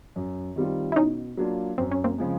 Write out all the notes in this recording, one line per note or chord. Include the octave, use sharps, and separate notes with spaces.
F#2
D#3 G3 C4 F4
E4
B2 C#4 D#4
F#3 A#3 D4 F4
F#2 C4
C#4
A#3 C4
C#3 F3 G#3